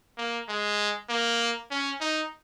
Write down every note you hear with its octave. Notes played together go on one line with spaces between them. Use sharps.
A#3
G#3
A#3
C#4
D#4